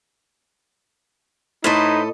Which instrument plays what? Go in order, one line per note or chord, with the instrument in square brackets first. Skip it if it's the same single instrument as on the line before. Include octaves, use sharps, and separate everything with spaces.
[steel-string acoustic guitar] A2 A4 D#5 [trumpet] D#4 [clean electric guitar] E4 B4 C5